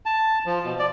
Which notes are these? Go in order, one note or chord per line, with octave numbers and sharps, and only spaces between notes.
A5
F3
B2
D5